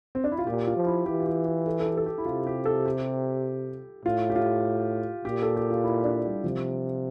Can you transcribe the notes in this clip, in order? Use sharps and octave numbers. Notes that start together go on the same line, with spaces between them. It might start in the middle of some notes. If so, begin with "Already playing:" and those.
C4
D4
E4
F4
A#2 G4
F4
F3
E4
E3 G4
F4
G4
G4
A4
A4
G4
A4
G4
E4
C3 F4
G4
A4
G4
A2 F4
G4
F4
A#2 G4
A4
G4
F4
E4
D4
G3
C3 F3